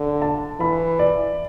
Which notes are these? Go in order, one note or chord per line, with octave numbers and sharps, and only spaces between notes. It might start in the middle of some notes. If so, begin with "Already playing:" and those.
Already playing: D3
A5
E3 B5
D5